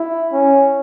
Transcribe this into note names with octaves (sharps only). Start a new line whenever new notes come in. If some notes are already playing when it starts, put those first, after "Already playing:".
Already playing: E4
C#4